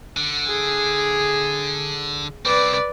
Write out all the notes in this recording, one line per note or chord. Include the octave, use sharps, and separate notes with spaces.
D3
G#4
C2 C4 B4 D5